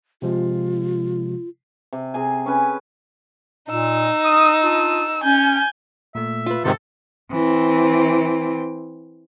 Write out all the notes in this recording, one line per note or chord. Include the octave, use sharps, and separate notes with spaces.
C3 F3 G#3 F4
C3
C3 G#4 G#5
C#4 B4
A#2 D#4 E6
D#6
D4 F4 D#6
C#4 G#5 G6
A#2 A3 E5
F4 B4
G#2 C3 D#3 A4
E3 C4